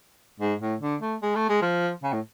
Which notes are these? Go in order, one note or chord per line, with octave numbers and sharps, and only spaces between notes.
G#2
A2
D3
A3
G#3
A3
G#3
F3
C#3
A2